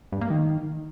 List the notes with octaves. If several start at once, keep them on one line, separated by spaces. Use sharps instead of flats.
G2
A#3
D#3